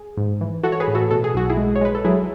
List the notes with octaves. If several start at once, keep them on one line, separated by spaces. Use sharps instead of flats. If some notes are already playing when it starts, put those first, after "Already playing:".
Already playing: G#4
G#2
E3
E3 F#4 A4
C#5
G#4 B4
A2
F#4 A4
B2 A4
G#4
B1 F#4
E4 G#4
G#3
C#5
G#3 B4
A4
F#3 E4 G#4